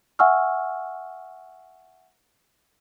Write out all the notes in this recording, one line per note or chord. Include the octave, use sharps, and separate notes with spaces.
E5 F#5 G#5 C#6 E6 F6